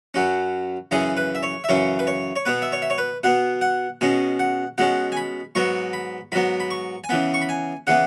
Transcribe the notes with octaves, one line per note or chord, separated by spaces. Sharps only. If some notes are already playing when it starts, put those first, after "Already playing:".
F#2 F#3 C#4
F#2 C#3 E3 C#4 G#4
B4
E5
C#5
E5
F#2 C#3 E3 C#4 C#5
B4
C#5
C#5
B2 B3 B4
E5
C#5
E5
C#5
B4
B2 B3 F#5
F#5
B2 G#3 C#4 G#5
F#5
B2 G#3 C#4 F#5
G#5
B5
G#2 F#3 B3 C#6
B5
G#2 F#3 B3 B5
B5
C#6
G#5
C#3 E3 B3 B5
C#6
B5
G#5
C#3 E3 B3 F#5